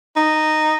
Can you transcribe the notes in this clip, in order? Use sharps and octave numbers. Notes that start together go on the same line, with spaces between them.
D#4